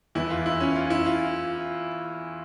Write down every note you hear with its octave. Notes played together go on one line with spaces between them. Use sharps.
E2 E3 E4
F4
E4
C#4
F4
E4
F4